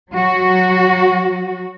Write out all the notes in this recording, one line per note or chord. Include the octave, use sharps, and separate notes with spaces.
F#3 F#4